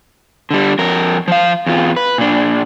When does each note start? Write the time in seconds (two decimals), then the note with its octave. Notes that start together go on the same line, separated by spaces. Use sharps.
0.51 D3 G3
0.79 F2 A#4
1.28 F3 F5
1.66 E2 F4
1.96 B4
2.18 A#2 D4